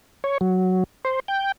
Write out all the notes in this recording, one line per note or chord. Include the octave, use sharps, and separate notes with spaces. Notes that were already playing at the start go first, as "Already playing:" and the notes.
C#5
F#3
C5
G5